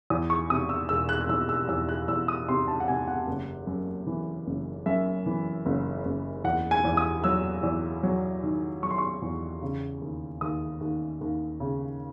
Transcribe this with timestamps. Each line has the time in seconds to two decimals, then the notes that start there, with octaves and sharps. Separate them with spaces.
0.10 E2 D#6
0.30 C#6
0.50 C3 D#6
0.69 E6
0.89 E1 E6
1.09 F#6
1.21 F#6
1.29 E2 E6
1.49 E6
1.69 E2 E6
1.89 F#6
2.08 E2 E6
2.28 D#6
2.48 C3 C6
2.68 A5
2.80 F#5
2.88 C3 G#5
3.07 F#5
3.27 F#1
3.67 F#2
4.06 E3
4.47 F#1
4.86 F#2 E5
5.26 E3
5.66 F#1
6.05 F#1
6.44 E2 F#5
6.71 G#5
6.85 E2
6.97 D#6
7.24 F#3 E6
7.63 E2
8.03 F#3
8.43 D#3
8.83 F#3 C#6
8.91 C6
8.98 C#6
9.22 E2
9.62 C#3
10.02 D#2
10.41 D#2 D#6
10.81 D#2
11.21 D#2
11.60 C#3